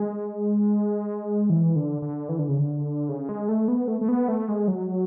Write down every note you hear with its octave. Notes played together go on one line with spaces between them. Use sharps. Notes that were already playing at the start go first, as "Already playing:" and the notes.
Already playing: G#3
E3
D3
D3
E3
D3
C#3
D3
C#3
G#3
A3
B3
A3
A3
B3
A3
G#3
F#3